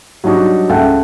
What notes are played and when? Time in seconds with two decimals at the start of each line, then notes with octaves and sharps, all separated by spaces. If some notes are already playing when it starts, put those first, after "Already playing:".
0.24 F#3 G3 D4 D#4 F#4
0.69 C#2 A4 E5 F#5 G5 A5